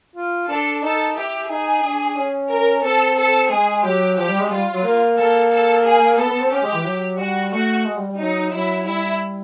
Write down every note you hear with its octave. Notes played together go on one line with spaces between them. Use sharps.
F4
D4 A4
D#4 A4
E4 G4
D#4 G#4
D4
C#4
A#4
C4 A4
A4
G#3 G#4
F#3 G4
F3 G4
G3
G#3
G3 F4
F#3
A#3
A#3 A4
A4
G#4
B3 A4
B3
C4
C#4 G4
G#3
E3
F#3
G3 F#4
A3 F#4
G#3
G3
G3
F#3 D#4
F#3 E4
G3 E4